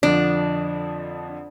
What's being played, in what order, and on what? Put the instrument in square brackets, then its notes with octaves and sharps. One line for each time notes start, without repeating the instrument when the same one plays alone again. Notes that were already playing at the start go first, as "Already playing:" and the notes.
[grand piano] F2 D3 F3 [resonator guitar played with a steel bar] D4